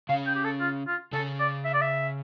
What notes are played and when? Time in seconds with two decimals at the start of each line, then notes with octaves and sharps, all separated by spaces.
0.09 C#3 C#4 F5
0.26 G5
0.35 G4
0.44 A4
0.60 F4
0.87 F4
1.13 C#3 C#4 A4
1.39 D5
1.65 E5
1.73 D5
1.81 E5